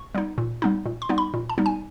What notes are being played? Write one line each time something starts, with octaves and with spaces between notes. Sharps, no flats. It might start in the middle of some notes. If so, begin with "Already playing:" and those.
Already playing: C#6
G3 B3 D#4
A#2
G3 B3 D#4
A#2
C6
G3 B3 D#4
B5
A#2
A5
G3 B3 D#4
G#5